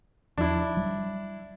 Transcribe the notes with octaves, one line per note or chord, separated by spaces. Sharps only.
E2 F3 D4 E4
F#3 G3